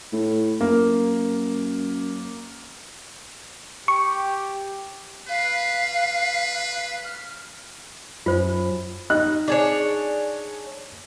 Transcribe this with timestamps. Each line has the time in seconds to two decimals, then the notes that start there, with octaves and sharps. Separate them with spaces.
0.13 A2
0.61 F#2 A#3
3.88 G4 C#6
5.28 B4 F5
7.04 F6
8.26 F#2 F4 C5
9.10 D#4 F#6
9.48 D4 G#4 C#5